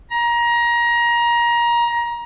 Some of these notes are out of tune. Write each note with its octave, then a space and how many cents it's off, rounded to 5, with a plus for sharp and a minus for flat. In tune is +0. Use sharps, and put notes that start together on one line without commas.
A#5 +25